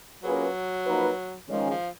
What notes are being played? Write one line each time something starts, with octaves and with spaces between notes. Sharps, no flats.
F#3 A#3 C#4 F4 G#4 B4
F3 A#3 D#4 F#4 B4
D#3 F3 G#3 C#4
F3